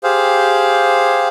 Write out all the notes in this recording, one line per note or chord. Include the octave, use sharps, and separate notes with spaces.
G4 G#4 C5 F5